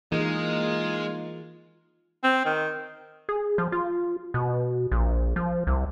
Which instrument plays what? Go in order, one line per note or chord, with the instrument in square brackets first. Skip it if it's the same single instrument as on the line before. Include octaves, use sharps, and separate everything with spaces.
[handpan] E3 G#4 [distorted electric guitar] G#3 [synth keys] A#3 D#4 [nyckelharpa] F4
[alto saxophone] C4
D#3
[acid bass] G#4
F3
F4
B2
A#1
F3
C2